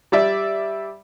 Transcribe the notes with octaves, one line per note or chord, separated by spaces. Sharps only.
G3 D5 E5